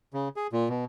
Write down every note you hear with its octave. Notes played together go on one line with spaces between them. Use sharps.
C#3
G#4
A#2
B2